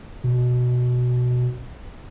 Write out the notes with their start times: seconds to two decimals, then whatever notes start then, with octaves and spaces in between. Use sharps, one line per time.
0.24 B2